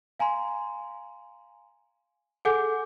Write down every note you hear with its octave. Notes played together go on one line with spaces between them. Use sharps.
F5 G#5 A#5 C6
G#4 A4 F#5 G#5 D6 G6